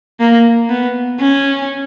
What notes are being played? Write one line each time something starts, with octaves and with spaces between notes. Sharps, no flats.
A#3
B3
C#4